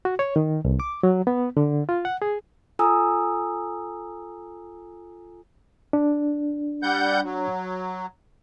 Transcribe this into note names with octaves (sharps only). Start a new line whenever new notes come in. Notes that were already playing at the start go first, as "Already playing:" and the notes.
F#4
C#5
D#3
C2
D6
F#3
B3
D3
F4
F#5
G#4
F4 A4 G#5 A#5 D#6 E6
D4
G3 F#5 G6
F#3